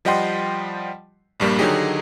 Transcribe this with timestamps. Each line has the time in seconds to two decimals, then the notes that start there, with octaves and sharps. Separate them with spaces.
0.05 F3 G3 D#5 F#5 G5 C6
1.40 A#1 G2 G3 A#3
1.59 D3 D#3 F#3 D#4 G4 G#4